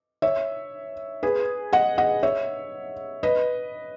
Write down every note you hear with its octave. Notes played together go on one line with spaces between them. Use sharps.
C#5 E5
G#4 B4
D#5 F#5
D#5 F#5
C#5 E5
B4 D#5